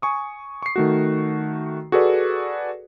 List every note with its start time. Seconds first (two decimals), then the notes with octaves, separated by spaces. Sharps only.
0.02 G#5 C#6 D#6
0.62 C#6 C7
0.76 D#3 A3 F#4
1.92 F#4 G#4 A4 B4 D5